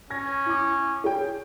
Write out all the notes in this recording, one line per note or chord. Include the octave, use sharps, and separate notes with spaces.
C#4 G#6 A#6
E4 D6
G#4 C#5 G5